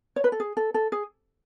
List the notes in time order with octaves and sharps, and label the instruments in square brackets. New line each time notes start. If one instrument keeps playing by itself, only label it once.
[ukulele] C#5
B4
A4
G#4
A4
A4
G#4